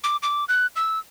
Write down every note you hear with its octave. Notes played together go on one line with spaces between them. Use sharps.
D6
D6
F#6
E6